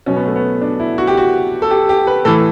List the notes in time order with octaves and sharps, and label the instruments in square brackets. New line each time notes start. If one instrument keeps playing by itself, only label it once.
[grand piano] B2 F#3 C#4
B3
A3
B3
D4
E4
F#4
G4
F#4
A4
G4
G4
B4
A2 E3 A4